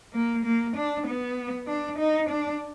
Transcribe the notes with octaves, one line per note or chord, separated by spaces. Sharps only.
A#3
A#3
D4
B3
D4
D#4
D4